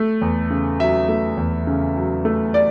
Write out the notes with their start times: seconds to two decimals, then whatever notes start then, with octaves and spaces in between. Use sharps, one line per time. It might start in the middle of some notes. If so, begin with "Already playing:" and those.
Already playing: A3
0.21 E2
0.50 C#3
0.80 F#3 E5
1.09 A3
1.37 E2
1.67 C#3
1.96 F#3
2.25 A3
2.54 D5